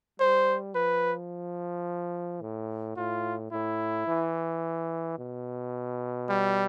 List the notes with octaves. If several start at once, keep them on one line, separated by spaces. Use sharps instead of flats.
G3 C5
F3 B4
A2
A2 F4
A2 E4
E3
B2
G3